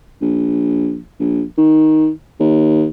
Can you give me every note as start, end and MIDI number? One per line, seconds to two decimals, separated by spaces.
0.21 0.98 34
1.20 1.43 34
1.58 2.09 51
2.40 2.87 39